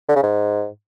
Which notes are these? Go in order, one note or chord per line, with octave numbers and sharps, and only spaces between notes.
D3
C#3
G#2